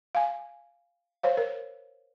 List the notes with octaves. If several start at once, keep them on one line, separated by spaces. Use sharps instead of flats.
F5 G#5
C5 C#5 F5
A#4 C#5